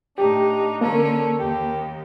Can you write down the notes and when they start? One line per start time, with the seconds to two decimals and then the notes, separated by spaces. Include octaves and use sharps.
0.18 A2 D4 D#4 G4
0.81 D3 A#3 C#4 A4 A#4
1.39 D#2 G4